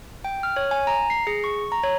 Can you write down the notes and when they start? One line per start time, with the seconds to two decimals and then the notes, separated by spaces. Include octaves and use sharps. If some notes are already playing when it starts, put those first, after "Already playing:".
0.25 G5
0.43 F6
0.57 C#5
0.71 G#5
0.87 A#5
1.10 C7
1.27 G#4
1.44 C#6
1.72 A#5
1.83 C#5